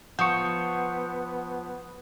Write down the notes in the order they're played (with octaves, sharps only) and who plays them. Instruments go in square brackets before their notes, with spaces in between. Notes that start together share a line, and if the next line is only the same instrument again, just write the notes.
[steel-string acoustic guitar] F3 [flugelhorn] B3 [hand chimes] F#5 D#6 C#7 [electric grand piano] C#6 G6